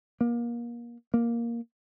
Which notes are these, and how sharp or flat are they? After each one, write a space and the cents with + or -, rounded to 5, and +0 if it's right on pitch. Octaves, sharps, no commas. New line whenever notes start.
A#3 +30
A#3 +5